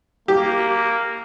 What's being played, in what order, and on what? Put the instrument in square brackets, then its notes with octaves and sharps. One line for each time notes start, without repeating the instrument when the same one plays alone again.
[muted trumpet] A#3 [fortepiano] G4